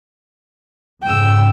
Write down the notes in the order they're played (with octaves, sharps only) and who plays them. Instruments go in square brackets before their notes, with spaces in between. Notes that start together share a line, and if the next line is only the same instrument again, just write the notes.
[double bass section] F2 G#2 C#3 [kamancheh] G5 E6